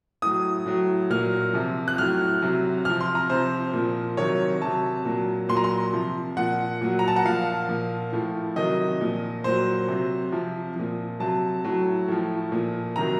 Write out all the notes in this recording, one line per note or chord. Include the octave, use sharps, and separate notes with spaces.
A2 F#3 D#6
A2 F#3
A#2 F#3 F6
C3 F3
F#6
A2 F#3 F6
C3 F#3
C3 F3 F6
C6
A#5
C3 F3 C5
A#2 F3
C3 D#3 F#3 C#5
C3 F#3 A5
A#2 F#3
A#2 F#3 C6
A#5
C6
C3 F3
A#2 F3 F#5
A#2 F#3
A#5
A5
F#5
A#2 F3 F5
A#2 F3
A2 F3
C3 D#3 F#3 D#5
A#2 F3
A#2 F#3 C5
C3 F#3
C3 F3
A#2 F3
C3 F#3 A5
A2 F#3
A2 F3
A#2 F3
C3 D#3 F#3 A#5